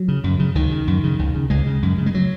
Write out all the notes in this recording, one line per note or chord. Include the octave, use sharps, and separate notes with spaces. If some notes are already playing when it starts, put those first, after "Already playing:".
Already playing: F#3
C#3
F#2
C#3
C#2 D#3
C#3
F#2
C#3
C#2
C#3
C#2 G#3
C#3
F#2
C#3
G#3
F#3